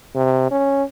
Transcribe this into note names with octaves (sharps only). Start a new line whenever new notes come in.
C3
C#4